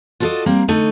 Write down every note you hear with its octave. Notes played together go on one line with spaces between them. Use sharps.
F4 F#4 A4 B4 D5 D#5
G3 A#3 C4
D3 A3 D#4 C#5